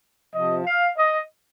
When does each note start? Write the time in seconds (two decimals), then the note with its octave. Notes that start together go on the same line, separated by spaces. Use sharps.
0.33 C3 F3 D#5
0.65 F5
0.97 D#5